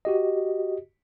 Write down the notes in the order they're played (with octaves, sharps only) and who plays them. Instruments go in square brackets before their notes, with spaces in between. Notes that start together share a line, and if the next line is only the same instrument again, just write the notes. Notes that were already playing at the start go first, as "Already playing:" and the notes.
[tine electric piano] F#4 G4 D#5